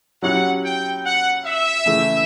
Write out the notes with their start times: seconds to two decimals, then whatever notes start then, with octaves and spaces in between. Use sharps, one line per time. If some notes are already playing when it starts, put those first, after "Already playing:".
0.22 F#3 C#4 E4 G4 F#5
0.63 G5
1.04 F#5
1.45 E5
1.86 C#3 E3 A3